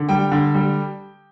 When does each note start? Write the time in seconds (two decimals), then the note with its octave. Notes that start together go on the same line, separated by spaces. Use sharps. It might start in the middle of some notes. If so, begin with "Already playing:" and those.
Already playing: D3
0.09 G3 G5
0.32 D3
0.54 G3